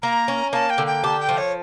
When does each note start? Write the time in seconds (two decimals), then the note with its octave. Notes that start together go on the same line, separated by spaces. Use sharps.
0.02 A#3 A#5
0.28 C#4
0.53 A#3 A5
0.70 G5
0.78 D3
0.87 G5
1.04 G4 A5
1.20 G5
1.29 F3
1.38 C#5